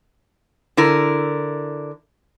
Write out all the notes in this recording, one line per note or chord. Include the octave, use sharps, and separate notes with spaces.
D3 E4 A#4